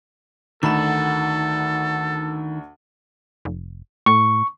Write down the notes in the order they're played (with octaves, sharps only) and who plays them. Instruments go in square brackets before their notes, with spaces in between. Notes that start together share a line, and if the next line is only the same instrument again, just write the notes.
[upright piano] D2 B5 E7 [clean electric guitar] D#3 [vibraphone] D#4 F#5 [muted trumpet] A4
[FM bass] F1
[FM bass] A2 [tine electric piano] C#6